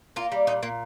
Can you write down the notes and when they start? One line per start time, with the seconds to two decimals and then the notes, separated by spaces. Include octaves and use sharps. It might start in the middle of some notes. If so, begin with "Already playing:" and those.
0.16 A#3 F4
0.32 G3
0.47 A#2 D#4
0.62 A#2 A#3